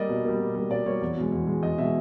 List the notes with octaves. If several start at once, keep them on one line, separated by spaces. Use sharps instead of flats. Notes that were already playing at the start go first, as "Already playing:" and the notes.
Already playing: G3 A#3 D5 D#5
B2
G3 A#3
B2
G3 A#3
B2 D5
G3 A#3 C#5
E2
B2 G#3
E2
B2 G#3
E2 D#5
B2 G#3 E5